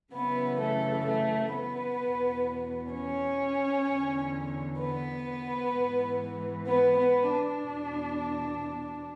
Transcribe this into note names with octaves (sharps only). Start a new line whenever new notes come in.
F#2 C#3 E3 B3 B4
A3 A4
A3 A4
B3 B4
E2 B2
C#4 C#5
E2 D3
B3 B4
G#2 E3
B3 B4
B3 B4
D4
E2 B2